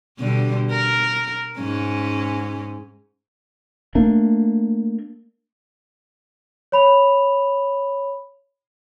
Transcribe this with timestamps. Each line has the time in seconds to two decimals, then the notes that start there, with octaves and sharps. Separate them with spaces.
0.19 B2 D3 G3
0.71 A#4
1.58 G#2 C#4
3.95 A3 A#3 D4
6.72 C#5 B5 F7